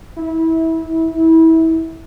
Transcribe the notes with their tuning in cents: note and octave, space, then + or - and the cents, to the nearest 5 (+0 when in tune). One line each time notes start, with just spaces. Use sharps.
E4 -25